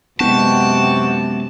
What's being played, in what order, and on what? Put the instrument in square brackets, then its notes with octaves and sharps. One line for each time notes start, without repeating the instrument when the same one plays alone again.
[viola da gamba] F#2 C3 [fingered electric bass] G#3 B3 [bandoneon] F#5 G5 C#6 [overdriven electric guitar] A5